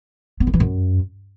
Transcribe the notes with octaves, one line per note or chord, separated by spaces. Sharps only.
B3
D#3
E3
F#2